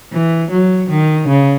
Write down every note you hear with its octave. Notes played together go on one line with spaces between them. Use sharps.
E3
F#3
D#3
C#3